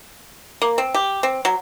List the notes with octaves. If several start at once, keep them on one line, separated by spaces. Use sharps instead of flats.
A#3
C4
G4
C4
F#3